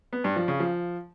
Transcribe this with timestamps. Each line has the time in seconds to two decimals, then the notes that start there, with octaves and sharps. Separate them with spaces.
0.13 B3
0.24 G2
0.36 F3
0.48 C#3
0.60 F3